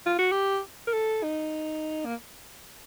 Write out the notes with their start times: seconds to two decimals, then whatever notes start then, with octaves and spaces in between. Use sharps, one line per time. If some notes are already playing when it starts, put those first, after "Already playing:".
0.06 F4
0.18 F#4
0.32 G4
0.87 A#4
0.93 A4
1.23 D#4
2.05 A#3